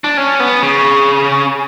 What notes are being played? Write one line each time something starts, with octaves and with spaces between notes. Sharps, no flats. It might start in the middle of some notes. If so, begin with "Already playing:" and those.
D4
C#4
B3
C#3